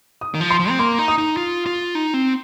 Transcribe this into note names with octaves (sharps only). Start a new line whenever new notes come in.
D#6
D#3
F3
C6
F3
C4
A#3 C6
D#4
D#6
D#4
F4
F4
D#4
C4